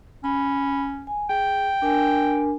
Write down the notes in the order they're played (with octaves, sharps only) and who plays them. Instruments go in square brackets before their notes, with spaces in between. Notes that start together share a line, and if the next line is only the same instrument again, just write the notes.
[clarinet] C#4 [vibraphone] B5
[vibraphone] G#5
[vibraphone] G#4 [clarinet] G5
[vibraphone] D4 A#4 G#5